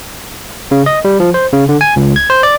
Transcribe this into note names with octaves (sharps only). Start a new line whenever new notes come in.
C#3
D#5
G3
F3
C5
C#3
D3
G#5
C#2
G#6
C5
D5